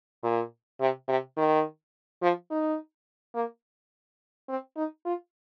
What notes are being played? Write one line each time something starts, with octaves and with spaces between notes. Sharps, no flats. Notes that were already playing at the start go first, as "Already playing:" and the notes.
A#2
C3
C3
D#3
F3
D#4
A#3
C4
D#4
F4